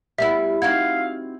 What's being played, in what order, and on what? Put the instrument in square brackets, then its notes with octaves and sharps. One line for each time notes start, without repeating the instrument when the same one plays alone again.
[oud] G3 B3 E4 [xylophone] E5
[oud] C4 D#4 F#4 [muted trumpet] F5 [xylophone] G#6